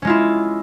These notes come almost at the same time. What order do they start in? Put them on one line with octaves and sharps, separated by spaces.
C#4 G#3 F4 E4